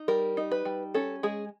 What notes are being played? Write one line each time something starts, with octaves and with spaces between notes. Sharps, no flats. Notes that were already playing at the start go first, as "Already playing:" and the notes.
Already playing: D#4
G3 A#4
D#4
B4
G3
C#4 A4
G#3 G#4